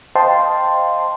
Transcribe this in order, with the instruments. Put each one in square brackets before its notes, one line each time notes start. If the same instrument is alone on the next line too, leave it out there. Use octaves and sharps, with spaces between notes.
[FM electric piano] C5 D#5 F5 G5 A5 C6